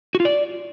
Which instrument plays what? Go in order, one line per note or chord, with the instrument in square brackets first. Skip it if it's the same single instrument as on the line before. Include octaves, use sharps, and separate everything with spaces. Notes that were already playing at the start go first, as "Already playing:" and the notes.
[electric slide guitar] F#4
F4
D5